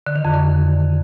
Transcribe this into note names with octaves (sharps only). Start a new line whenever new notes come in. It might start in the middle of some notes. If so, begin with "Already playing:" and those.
D3
D#3
F2
D3